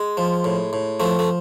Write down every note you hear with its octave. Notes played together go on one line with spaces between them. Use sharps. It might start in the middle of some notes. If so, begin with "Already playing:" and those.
Already playing: G#3
F3
A2
A2
F3 A3
A3